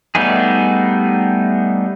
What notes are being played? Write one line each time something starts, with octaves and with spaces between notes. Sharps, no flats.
G3 A3 B3 D#4 G#4